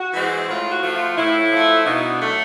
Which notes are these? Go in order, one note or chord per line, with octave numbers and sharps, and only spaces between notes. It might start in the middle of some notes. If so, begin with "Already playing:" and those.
Already playing: F#4
E3 G#3 C4
A2 F4
F#4
F3 A3
F4
A2 E4
F3 A3
B2 D#4
D4
F#3 A3